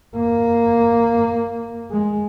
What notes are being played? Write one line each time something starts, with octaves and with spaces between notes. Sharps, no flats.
A#3
G#3